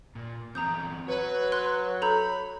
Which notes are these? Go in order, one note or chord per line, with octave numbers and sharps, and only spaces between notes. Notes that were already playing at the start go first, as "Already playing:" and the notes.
A#2
E2 C4 A#5 D#6 G6
F#3 B4 C#5
C6 F#6
A4 A#5 B5 G6